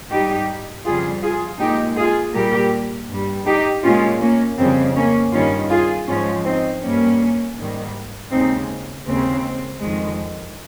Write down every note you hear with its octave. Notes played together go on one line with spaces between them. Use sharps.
G#2 G3 D#4 G4
F2 C#3 G3 F4 G#4
F4 G#4
A#2 G#3 D#4 G4
F4 G#4
A#2 G3 G4 A#4
G2 G3
D#4 G4
A#2 G#3 C#4 F4
A#3 C#4
F2 C#3 G3 C4
A#3 C#4
G2 D#3 G3 C#4 F4
F4 G#4
G#2 F3 G#3 C#4 F4
C4 D#4
G2 G3 A#3 C#4
G#2 D#3 G3
D#2 C#3 G#3 C4 D#4
D#2 C#3 G#3 C4
F2 D#3 G#3